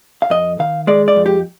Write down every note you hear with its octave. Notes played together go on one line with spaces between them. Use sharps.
F5
F2 D#5
D#3 F5
G#3 D5
D5
F2
G4